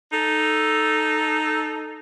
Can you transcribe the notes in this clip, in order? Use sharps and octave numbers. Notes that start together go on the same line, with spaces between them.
D#4 A4